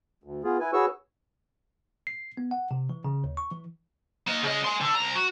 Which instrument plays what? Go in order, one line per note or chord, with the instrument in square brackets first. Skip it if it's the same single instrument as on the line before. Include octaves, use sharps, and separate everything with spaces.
[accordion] D2
B3 F4 G#4
E4 B4 G#5
F#4 G#4 B4 C#5 C#6 E6
[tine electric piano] C7
B3
F#5
C3
E3
C#3
D#2
C#6
E3
[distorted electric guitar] A#3 D#5
C#3 D#5
G#5 C6
D3 A4
C2 A#5
F#4